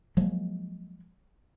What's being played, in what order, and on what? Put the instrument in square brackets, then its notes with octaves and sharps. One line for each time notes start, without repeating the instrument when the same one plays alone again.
[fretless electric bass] F3 F#3 G#3 A#3